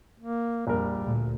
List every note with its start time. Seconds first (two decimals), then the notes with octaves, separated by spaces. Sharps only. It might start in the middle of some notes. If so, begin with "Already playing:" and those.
0.20 A#3
0.67 A#1 F2 G3 A#4
1.00 D2 A#2